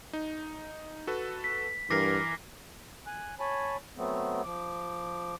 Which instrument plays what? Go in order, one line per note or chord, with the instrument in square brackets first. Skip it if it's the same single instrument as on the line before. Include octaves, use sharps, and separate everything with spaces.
[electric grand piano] D#4
F#4 A4 B4
[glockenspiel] B6
[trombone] G2 [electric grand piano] E3 A#4 [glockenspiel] D6 A#6 C7
[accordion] G#5 F#6
C#5 G#5 A5 B5
F#3 A3 B3 C4
F3 D6